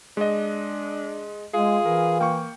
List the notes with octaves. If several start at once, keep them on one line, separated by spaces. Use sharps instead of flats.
G#3 D4 D#5
G#3 F4 G#4
E3 A#4
A#3 G5 C#6